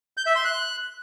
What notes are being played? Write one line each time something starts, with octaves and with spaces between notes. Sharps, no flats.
G6
E5
C6
F#6